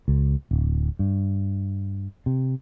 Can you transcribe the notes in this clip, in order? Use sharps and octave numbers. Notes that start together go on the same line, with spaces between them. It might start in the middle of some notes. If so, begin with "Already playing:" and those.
C#2
D1
G2
C3